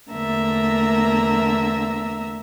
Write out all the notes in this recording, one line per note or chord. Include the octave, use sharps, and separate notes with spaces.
E2 D3 A3 A#3 E5 A#5